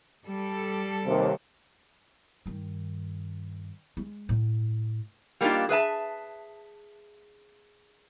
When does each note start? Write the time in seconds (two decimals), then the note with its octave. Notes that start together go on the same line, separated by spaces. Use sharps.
0.24 G3 A4
1.05 D#2 C3
2.46 G2 D#3
3.97 G#3
4.29 A2
5.41 G3 A#3 D4 D#4 F4
5.69 G#4 B4 E5 A5